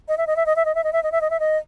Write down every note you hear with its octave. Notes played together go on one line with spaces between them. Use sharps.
D#5
E5
D#5
E5
D#5
E5
D#5
E5
D#5
E5
D#5
E5
D#5
E5
D#5